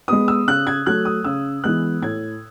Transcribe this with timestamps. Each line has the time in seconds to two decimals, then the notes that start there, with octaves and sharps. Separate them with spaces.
0.08 G#3 B3 D#6
0.28 E6
0.47 C#3 F#6
0.67 G#6
0.86 F#3 A3 F#6
1.05 D#6
1.24 C#3 E6
1.64 E3 G#3 B3 F#6
2.02 A2 G#6